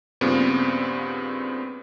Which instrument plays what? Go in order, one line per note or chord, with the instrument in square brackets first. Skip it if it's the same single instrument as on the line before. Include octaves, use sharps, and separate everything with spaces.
[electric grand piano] G2 A#2 C#3 B3 C4